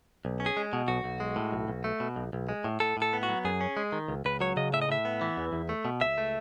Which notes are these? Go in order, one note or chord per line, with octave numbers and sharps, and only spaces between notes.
B1
C#4
G#4
G#3
B2
B1 F#4
B1
G#3
A2
B1
B1
A3
B2
B1
B1
G#3
A2
A2 A4
A2 A4
B3
F#4
F#3
F#2 G#4
C#4
G#3
D#3
C#2
C#2 B4
F#3 C#5
C#3 D#5
A2 E5
D#5
A2 E5
B3
E3
E2
E2
A3
B2
C#2 E5
A3